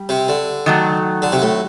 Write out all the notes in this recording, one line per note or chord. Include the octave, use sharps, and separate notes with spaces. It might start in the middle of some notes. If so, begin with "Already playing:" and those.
Already playing: G3
C3
D3
D#3 F#3 A3
D3
C3
A2